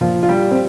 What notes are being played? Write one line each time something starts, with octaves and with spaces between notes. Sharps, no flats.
A#2 F3 F4
F4
G3 G4
C4